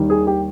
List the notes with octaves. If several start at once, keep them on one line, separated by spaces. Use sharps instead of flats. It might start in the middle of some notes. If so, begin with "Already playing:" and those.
Already playing: D#2 D#3 G3
G#4
G4